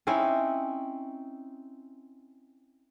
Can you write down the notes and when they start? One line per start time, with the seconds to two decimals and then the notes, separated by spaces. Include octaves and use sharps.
0.07 C4 C#4 D#4 E4